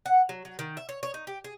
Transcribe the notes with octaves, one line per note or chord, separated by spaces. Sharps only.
F#5
F#3
F#3
D#3
E5
C#5
C#5
D#4
G4
G#4